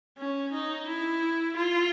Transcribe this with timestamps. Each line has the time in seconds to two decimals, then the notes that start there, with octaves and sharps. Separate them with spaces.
0.18 C#4
0.52 D#4
0.87 E4
1.56 F4